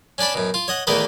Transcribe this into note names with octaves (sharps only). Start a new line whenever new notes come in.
C#4 D4 D5 A5 B5
F#2 B2
F4
C#5 D#5 F#5
E2 D#3 A3 A#3 B4 D#5